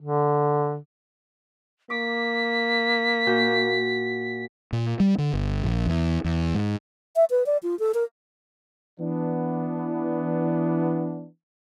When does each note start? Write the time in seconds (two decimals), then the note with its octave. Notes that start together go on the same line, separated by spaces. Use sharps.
0.01 D3
1.90 A#3 D6 B6
3.27 A#2 F#4 G6
4.73 A#2
5.00 G3
5.18 D3
5.33 G1
5.64 A#1
5.86 E2
6.24 E2
6.54 G#2
7.16 E5
7.30 B4
7.46 D5
7.63 F4
7.79 A4
7.94 A#4
9.00 E3 B3 D4